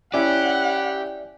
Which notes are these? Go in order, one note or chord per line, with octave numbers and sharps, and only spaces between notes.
C#4 E4 G4 D5 E5 F#5 G#5